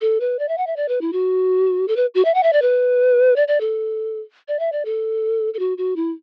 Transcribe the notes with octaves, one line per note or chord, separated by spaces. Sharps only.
A4
B4
D5
E5
F#5
E5
D5
B4
E4
F#4
A4
B4
F#4
E5
F#5
E5
D5
B4
D5
D5
A4
D5
E5
D5
A4
A4
F#4
F#4
E4